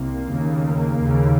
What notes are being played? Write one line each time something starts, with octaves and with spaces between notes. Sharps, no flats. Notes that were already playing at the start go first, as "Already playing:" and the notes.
Already playing: C2 C3 A#3
D#2 C#3
A#3
D#2 C#3